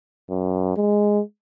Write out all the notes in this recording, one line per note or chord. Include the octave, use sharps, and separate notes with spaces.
F#2
G#3